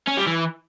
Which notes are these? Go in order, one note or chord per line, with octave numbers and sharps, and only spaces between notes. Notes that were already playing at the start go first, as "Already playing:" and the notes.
C#4
G3
E3